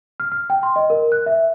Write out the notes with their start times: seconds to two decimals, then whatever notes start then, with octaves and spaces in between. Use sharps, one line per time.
0.20 F6
0.32 F6
0.50 G5
0.63 C6
0.76 D#5
0.90 A#4
1.12 F#6
1.26 E5